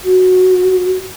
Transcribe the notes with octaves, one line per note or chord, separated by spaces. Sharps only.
F#4